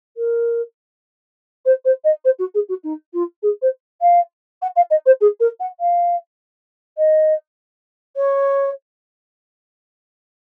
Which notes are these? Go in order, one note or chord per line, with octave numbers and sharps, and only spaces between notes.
A#4
C5
C5
D#5
C5
F#4
G#4
F#4
D#4
F4
G#4
C5
F5
F#5
F5
D#5
C5
G#4
A#4
F#5
F5
D#5
C#5